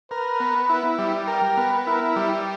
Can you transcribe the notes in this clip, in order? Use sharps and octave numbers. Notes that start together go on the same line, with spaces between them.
A#4 B4
B3
E4
G3
A#4 G5
B3
E4 A#4
G3